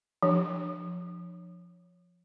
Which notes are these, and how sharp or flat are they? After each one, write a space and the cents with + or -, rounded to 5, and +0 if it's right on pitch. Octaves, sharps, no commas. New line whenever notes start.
F3 +0 D4 +25